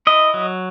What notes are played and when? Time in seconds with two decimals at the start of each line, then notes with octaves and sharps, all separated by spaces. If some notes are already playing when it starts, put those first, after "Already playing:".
0.07 E4 D#5
0.34 F#3